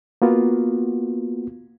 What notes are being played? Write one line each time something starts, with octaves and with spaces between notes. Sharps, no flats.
A#3 B3 F4 F#4